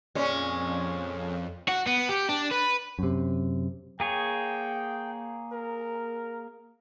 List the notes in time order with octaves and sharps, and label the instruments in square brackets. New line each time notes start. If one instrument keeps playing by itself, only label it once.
[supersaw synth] F2 [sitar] A#2 G#3 C#4
[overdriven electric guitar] F#4
B3
G4
D4
B4
[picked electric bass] F#2 C3
[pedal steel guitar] A#3 G#4 C#5 [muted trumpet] G5
[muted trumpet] A#4